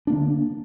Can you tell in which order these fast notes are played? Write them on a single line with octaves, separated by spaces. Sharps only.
D4 A#3 D3